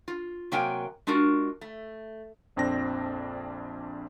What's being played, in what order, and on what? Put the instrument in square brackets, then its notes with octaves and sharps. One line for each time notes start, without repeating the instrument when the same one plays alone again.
[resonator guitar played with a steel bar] F4
C3 F#3 A#3 A#4 G5 G#5
G#3 D4 F4 F#4 A#4
A3
[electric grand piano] A#1 F2 C4 D4 A#6